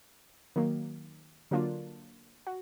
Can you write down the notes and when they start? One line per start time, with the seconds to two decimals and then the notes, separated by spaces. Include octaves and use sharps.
0.56 D#3 F#3 A#3
1.51 D3 F#3 A#3 D4 F4
2.47 F#4